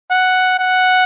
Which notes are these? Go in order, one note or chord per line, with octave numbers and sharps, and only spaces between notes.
F#5
F#5